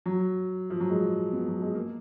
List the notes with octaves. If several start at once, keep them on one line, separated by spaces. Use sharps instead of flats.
F#3
F3
F#3
G#3
B3
F#3
G#3
A#3